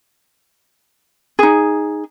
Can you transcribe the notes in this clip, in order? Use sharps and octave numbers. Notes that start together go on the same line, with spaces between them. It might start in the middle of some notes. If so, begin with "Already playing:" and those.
D#4 G#4